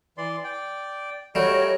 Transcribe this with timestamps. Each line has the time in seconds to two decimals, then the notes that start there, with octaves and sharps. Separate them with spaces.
0.18 E3 D5 C6
0.44 D5 G5
1.35 G3 A3 F#4 A#4 C#5 D#5 G5